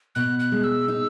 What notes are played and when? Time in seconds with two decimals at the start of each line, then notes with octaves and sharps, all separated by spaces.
0.15 B2 F#6
0.40 F#6
0.52 G#3
0.64 E6
0.88 D#4